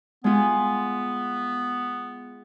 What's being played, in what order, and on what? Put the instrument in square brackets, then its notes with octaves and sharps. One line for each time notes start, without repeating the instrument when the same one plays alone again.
[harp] G#3 F4 [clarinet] B3